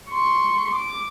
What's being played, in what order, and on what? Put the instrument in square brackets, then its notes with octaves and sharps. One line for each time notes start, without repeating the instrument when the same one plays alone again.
[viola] C6 C#6
D6